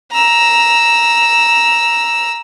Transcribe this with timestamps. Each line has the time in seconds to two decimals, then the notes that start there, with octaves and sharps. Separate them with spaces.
0.12 A#5 E6